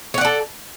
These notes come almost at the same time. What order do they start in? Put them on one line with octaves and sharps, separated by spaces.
C#5 F#5 D5 A4